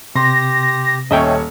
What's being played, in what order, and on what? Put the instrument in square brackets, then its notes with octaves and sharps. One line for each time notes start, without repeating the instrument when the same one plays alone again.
[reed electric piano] C3 [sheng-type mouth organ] G4 [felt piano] C6 [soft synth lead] A#6
[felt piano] D#1 C#5 [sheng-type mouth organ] C#4 A4 [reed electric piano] D#5 E5 G5